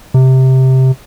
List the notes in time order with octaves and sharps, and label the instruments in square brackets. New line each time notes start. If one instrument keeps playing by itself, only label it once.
[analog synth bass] C3